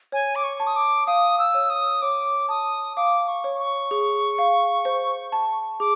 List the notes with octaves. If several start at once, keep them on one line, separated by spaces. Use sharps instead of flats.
C#5 G#5
D6
C#6
A5
D#6
D6
F5 D#6
E6
C#5
D#6
C#5 D6
A5 D#6
F5 D6
C#6
C#5
C#6
G#4
F5
C5
A5
G#4 D6